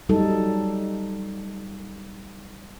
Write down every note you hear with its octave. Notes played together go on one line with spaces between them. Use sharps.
F#3 G3 D#4 A4